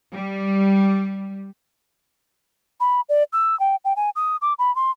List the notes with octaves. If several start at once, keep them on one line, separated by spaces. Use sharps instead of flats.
G3
B5
D5
E6
G5
G5
G#5
D#6
D6
B5
C6